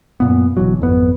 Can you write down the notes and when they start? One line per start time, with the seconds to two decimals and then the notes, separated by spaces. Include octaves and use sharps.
0.20 F#2 A#2 B3
0.57 G1 B2 E3 F#3
0.80 G#1 F2 B3